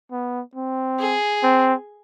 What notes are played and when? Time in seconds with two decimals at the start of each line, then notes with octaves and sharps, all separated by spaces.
0.11 B3
0.55 C4
0.99 G#4
1.43 C4